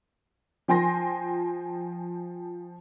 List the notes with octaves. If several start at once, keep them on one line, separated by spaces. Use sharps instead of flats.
F3 G5 G#5 C6 A#6